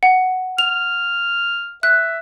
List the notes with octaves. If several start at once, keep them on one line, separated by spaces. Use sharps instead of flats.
F#5
F6 F7
E5 F#6